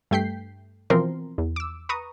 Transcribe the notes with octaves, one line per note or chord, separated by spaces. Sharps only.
G2 A3 G5 G6 B6 C7
B2 E3 F3 C4 A#4 C6
E2
D6 E6
B4 A#5 C#6 D#6